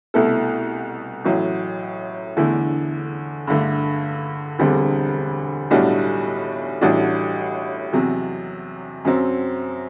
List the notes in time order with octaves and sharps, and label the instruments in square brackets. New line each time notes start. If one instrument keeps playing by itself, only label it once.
[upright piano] C2 B2 A3 E4 A4
A1 A2 F#3
E2 D3 A3 E4
G2 D3 A3
E1 D2 D3 G3 C4
B1 A2 G3 D4 F#4
A1 A2 G3 D4 F#4
E2 C3 F#3
F#2 F#3 C4